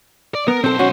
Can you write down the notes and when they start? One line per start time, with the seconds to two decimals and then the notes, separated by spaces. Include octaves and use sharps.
0.35 D5
0.48 B3 A#4
0.64 B1 C4 A4 C5
0.79 C#4 F#4